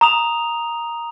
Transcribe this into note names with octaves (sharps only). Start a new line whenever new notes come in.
A#5 D#6 F7